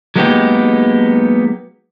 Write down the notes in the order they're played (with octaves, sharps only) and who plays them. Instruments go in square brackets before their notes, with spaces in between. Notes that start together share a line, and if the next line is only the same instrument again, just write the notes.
[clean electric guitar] F#3 G#3 A#3 B3 D#4 G4